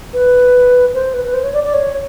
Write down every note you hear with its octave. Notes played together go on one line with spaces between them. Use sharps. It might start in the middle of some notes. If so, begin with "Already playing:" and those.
B4
C5
B4
B4
C5
C#5
D5
D5
C#5